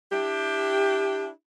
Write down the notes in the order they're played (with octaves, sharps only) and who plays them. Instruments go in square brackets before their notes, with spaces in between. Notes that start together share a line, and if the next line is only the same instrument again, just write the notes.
[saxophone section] D4 E4 G4